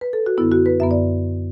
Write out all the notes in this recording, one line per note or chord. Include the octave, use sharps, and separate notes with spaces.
B4
A4
F#4
F#2 D3 B3 E4
F#4
B4
F#2 D3 B3 E5
D5